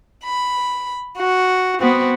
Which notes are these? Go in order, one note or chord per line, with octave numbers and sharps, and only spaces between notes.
B5
F#4
B3 C4 F#4